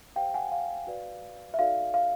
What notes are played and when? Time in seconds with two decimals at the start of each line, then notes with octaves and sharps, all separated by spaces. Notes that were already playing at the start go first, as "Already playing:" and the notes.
0.16 G4 C5 F5 G5
0.34 F#5 G#5
0.52 F5
0.87 F#4 B4 D5
1.54 E5
1.58 D#4 F#4 A4 D5 F5
1.94 F5